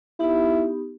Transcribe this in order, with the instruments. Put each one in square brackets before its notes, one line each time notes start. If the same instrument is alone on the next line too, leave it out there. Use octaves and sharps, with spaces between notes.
[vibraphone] B3 D#4 G4 [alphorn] E4